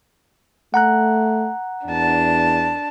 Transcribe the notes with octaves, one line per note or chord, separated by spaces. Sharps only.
A3 F#5 A#5 F#6
E2 D4 A5